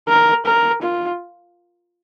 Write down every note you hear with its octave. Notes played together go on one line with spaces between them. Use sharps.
A#4
A#4
F4